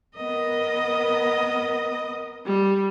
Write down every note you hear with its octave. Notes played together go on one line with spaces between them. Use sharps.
B3 A#4 D#5
G3